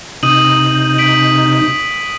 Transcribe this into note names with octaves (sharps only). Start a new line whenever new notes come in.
C3 D#4 D#6 D#7 F#7
B6 D7 F#7